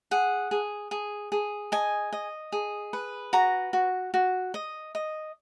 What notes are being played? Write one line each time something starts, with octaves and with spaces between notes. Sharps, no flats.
G#4 F#5
G#4
G#4
G#4
D#5 G#5
D#5
G#4
B4
F#4 A#5
F#4
F#4
D#5
D#5